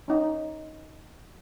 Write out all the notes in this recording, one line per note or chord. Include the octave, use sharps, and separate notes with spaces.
C#4 D#4